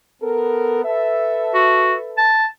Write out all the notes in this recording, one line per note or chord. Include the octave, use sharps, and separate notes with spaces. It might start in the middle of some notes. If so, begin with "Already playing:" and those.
B3 A4 A#4
A4 B4 E5
F#4
A5